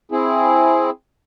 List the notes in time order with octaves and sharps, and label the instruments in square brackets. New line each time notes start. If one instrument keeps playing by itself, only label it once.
[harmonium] C4 E4 G#4